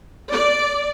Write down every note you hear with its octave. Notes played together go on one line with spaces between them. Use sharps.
D5